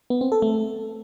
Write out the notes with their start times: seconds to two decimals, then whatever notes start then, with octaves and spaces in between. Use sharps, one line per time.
0.10 B3
0.21 C4
0.32 A4
0.42 A3